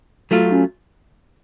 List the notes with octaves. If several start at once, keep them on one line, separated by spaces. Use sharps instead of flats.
F#3 A3 F4
F#4
C#4